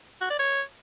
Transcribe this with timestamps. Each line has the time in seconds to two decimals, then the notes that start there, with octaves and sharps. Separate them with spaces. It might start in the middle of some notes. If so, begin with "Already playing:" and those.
0.21 F#4
0.30 D5
0.39 C#5